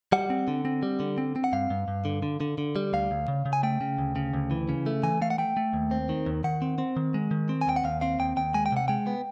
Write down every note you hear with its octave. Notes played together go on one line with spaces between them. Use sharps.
G3 F#5
C4
D3
C4
G3
D3
C4
C4
F#5
G2 F5
G2
G2
D3
D3
D3
D3
G3
D2 F5
D2
C#3
C#3
G#5
A3 G5
C#3
D2
C#3
D2
E3
C#3
A3
E3 G#5
A3 F5
F#5
A3 G5
A3
D#2
C4
D#3
D#2
D#3 F#5
C4
C4
D#3
G#3
D#3
C4
G#5
D#2 G5
F#5
D#2 F5
C4 F5
D#2 G5
D#2 G5
G#3 G#5
G5
C3 F#5
G#3 G5
B3